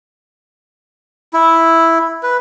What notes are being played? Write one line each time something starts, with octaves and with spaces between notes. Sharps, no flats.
E4
B4